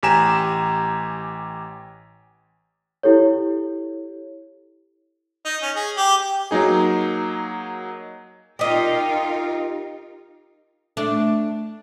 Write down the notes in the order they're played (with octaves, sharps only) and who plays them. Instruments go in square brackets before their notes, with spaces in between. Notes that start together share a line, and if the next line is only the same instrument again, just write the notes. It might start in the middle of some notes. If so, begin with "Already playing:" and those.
[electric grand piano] A1 G4 G#5 A#5 E7
[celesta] E4 G4 A4 C#5
[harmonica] D#4
C#4
G#4
G4
[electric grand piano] F#3 A#3 D#4 G#4
[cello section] D#4 F4 A#4 [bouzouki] G4 D#5
[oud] A3 D4